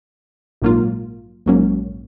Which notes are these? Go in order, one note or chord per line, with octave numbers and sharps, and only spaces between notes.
A#1 G#2 F#3 A#3 F4
A#1 G#2 F#3 A#3 C#4